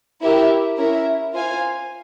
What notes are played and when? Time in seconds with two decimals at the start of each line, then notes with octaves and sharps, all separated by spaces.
0.21 E4 G4 A#4 E5
0.78 C#4 E4 A#4 E5
1.34 F4 C5 F5 G#5